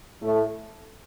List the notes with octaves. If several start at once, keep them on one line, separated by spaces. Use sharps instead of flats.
A2 A3